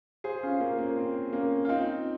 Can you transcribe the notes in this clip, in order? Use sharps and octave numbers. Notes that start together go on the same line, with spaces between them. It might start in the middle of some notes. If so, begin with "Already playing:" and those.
G#4 C5
C#4 F4
A#3 C#4
A#3
C4
A#3 C#4
F4
C4 D#4